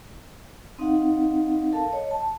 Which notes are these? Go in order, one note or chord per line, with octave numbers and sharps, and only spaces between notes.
C4 D#4 D#5 F5 F#5
A4 A#4 F5 A5
C#5 D#5
A5